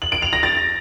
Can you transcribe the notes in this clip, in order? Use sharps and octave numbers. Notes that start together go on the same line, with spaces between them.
F#7
D7
F7
A#6
A6